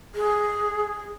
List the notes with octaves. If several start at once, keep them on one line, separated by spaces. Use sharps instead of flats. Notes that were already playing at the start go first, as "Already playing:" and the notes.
G#4